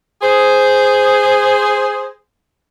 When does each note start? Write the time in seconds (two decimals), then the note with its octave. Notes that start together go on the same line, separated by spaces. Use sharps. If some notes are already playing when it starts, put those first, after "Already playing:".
0.22 G#4 C5